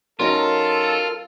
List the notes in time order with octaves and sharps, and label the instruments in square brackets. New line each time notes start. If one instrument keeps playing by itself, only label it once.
[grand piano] F#3 C#4 D#4 [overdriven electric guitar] F4 [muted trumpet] A4 [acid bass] A#4